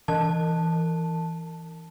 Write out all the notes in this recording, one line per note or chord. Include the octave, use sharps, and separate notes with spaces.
E3 A5